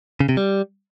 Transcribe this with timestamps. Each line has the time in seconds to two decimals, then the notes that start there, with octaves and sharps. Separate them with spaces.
0.20 C#3
0.29 C3
0.37 G3